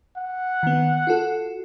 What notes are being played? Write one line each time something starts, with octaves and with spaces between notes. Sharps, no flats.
F#5
D#3 B3
F4 F#4 A4